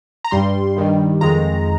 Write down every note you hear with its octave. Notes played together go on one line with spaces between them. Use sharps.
A#5
G2 G3 C6
G2 D#3 G3
F2 D#3 G#3 A#5